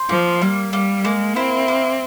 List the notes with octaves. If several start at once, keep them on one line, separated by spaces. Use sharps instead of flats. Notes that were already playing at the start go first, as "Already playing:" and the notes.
Already playing: C5
F3 A#3
G3 A#3
G3 A#3
G#3 A#3
C4 E4
A#3